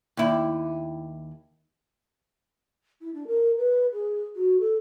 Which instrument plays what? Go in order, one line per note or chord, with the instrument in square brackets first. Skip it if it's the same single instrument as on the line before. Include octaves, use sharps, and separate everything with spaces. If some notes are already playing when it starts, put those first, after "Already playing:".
[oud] D#2 E4
[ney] E4
D4
A#4
B4
G#4
F#4
A4